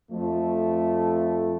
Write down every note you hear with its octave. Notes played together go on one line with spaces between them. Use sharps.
F2 A3